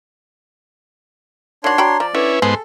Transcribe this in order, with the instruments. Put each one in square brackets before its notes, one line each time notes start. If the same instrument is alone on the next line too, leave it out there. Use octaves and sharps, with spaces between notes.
[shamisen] D#3 F#4 [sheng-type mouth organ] D4 C#5 C6
[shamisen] F#4 G5 B5 [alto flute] A#5
[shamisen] F3 [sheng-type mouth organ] D5
[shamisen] D3 [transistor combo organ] C#4 E4 [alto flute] B4
[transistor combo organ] G#2 B3 C5 [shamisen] G#4 [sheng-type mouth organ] A4